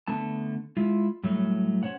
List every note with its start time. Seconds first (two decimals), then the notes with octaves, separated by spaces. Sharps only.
0.08 D3 A3 B3 A5
0.77 G#3 E4 F4
1.23 A2 F#3 G3 A3
1.83 C#4 C5 C#5 F#5